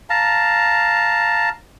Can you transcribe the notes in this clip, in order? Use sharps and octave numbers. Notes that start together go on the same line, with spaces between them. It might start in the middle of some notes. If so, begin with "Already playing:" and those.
F5 A5 A#5